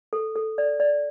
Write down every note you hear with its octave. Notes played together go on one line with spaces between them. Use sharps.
A4
A4
D5
D5